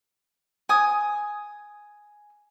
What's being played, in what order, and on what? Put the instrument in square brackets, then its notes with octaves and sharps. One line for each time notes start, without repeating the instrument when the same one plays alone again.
[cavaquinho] G#5 D#6